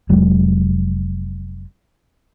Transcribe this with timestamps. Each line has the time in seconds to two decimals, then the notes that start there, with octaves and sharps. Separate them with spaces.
0.09 F1 F#3 G#3